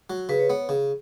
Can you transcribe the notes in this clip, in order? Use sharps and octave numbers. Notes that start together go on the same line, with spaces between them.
F#3 F#4
C#3 B4
C#5
B3 C#5
C#3